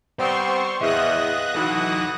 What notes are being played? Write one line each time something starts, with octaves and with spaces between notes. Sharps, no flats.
G3 B3 C4 C5 C6 C#6
E2 D#5 E5 D#6 F#6 A#6
E3 D#4 F#4 A4